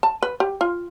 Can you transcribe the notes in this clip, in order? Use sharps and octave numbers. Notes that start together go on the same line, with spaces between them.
A5
B4
G4
F4